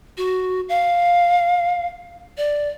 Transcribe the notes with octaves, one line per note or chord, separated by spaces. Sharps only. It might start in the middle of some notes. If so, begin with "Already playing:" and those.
F#4
F5
D5